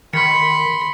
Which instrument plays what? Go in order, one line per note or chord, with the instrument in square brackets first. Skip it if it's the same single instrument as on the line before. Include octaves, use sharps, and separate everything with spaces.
[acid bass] D#3 [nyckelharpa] B5 C6 [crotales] B6 C#7